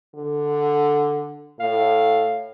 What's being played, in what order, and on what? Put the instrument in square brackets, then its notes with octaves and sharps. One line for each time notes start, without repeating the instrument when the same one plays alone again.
[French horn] D3
[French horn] A2 [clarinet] F5